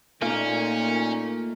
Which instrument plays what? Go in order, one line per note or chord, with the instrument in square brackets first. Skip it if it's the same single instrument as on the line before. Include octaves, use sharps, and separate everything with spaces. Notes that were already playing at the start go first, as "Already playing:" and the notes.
[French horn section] A#2 [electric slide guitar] A3 A#3 F4 [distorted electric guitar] C#4 [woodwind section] D#4